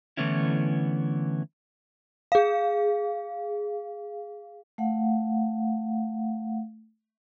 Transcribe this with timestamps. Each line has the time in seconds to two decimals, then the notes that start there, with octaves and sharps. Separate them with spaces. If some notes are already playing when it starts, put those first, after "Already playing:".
0.17 D3 E3 A3 B3 C#4 E4
2.32 G#4 F5
4.78 A3 F5 F#5